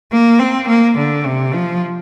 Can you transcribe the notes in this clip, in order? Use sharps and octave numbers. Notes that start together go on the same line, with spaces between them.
A#3
C4
A#3
D3
C3
F3